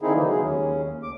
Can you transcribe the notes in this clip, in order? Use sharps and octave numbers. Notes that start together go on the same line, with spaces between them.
D3 D#3 C4 D#4 E4 G#4
C#3 E3 F#3 A#3
D#3 G#3 G#4
D#2 C#4
D2 D6